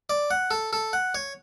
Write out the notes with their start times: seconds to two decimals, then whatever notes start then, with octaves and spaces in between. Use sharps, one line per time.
0.10 D5
0.31 F#5
0.51 A4
0.73 A4
0.93 F#5
1.15 C#5